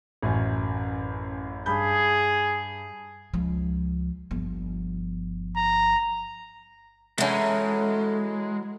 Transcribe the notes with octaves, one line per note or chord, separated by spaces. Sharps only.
A1 F#2
G2 G#4 B5 G6
C#2 F3
G1 F3
A#5
E3 F#3 G#3 A3 C#4